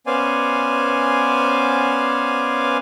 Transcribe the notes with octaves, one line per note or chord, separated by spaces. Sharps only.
B3 C#4 C5 D5 F5 G#5